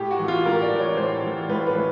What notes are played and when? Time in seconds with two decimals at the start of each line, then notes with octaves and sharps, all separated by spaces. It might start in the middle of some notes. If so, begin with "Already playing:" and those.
Already playing: A2 G4
0.11 F#4
0.19 E3
0.28 F4
0.46 A2 A#4
0.62 D5
0.71 E3
0.80 C#5
0.97 A2 C5
1.23 E3
1.49 A2 B4
1.67 B4
1.75 E3